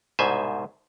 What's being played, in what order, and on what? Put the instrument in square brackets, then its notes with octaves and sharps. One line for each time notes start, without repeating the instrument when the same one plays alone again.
[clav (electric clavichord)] C2 G#2 B2 C5 E5 G#5